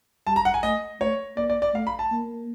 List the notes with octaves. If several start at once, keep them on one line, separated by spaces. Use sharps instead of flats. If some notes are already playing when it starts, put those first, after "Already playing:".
G3 A5
A#5
F#5
G#5
A3 D#5
A3 C#5
A#3 D5
D5
D5
A3 F5
B5
A5
A#3